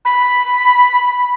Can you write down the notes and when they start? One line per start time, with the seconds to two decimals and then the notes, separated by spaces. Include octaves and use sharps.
0.05 B5